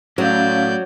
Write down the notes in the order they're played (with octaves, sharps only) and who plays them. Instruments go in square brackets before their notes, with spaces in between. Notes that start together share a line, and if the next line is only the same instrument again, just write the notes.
[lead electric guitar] A2 [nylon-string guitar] F#3 [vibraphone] C#4 F5 [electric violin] D5 G6